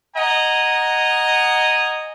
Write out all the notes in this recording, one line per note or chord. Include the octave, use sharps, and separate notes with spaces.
D#5 F#5 G#5 A#5